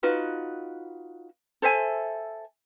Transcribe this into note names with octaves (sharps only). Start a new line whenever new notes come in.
D#4 F4 F#4 B4
A4 C5 E5 G#5